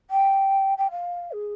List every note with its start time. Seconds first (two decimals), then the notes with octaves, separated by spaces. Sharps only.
0.10 G5
0.78 G5
0.91 F5
1.32 G#4